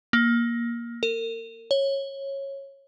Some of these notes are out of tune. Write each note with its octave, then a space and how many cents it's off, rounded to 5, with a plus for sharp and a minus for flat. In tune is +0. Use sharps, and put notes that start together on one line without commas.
A#3 +15
A#4 -40
C#5 -15